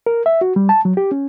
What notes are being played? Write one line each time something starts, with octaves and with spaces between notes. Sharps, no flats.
A#4
E5
F#4
G3
A5
F#3
G4
C#4